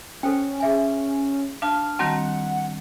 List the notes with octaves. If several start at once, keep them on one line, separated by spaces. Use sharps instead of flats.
C#4 A4 C5 G5
G#4 E5 G#5
D4 F5 A5 F6
D#3 G3 C4 F#4 F#5 A5 A#5